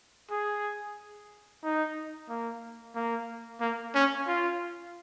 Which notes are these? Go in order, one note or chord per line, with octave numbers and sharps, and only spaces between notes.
G#4
D#4
A#3
A#3
A#3
C#4
F4